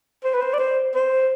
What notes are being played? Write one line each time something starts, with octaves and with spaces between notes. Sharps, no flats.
C5
B4
C5
D5
C5
C5